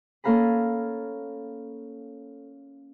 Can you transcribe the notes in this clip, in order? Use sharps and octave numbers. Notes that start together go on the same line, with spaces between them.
A#3 C#4 A4 F5 A#5 B5